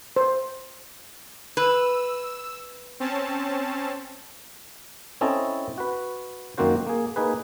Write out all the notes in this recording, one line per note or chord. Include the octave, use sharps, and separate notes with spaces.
C5
B4 E6
C4 C#4 A5
C4 C#4 E4 A4 D#5 A5
F#4 B4
F#2 D#3 A#3 C4 F#4 C5
A#3 G#4
A#3 D#4 G#4 B4